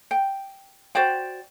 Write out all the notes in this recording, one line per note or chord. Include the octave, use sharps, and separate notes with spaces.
G5
F#4 C5 D5 G5